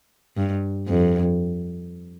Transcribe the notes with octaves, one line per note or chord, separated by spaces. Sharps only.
G2
F2